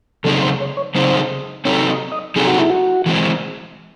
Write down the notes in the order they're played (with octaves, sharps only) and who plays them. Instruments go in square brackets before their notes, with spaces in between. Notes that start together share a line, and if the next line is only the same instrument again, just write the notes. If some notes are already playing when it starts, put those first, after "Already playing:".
[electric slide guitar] C#3 F#3 C4 D#4 G#4 [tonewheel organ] A4
[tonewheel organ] C5
C#5
C#5
[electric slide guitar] C#3 F#3 C4 D#4 G#4 [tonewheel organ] C5
[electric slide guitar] F#3 C4 D#4 A4 [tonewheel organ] C#5
[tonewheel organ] D#5
D#5
[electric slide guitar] F#3 C4 D#4 A4 [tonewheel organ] G#4
[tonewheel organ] F#4
E4
F#4
[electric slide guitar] E3 G#3 C4